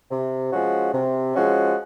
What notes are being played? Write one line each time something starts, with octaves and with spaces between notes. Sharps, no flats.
C3
F3 G#3 C#4 F#4
C3
F3 G#3 C#4 F#4